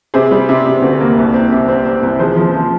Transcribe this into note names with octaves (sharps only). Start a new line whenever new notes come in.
C3 G#4 C5
G3
C3
C3
D2
A#3
C2
C4
C3
C4
C4
C2
F3 G#4 C5
F3
F3